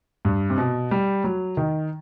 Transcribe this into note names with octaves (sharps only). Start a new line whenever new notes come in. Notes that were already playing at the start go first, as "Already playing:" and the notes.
G2
C3
B2
G3
F#3
D#3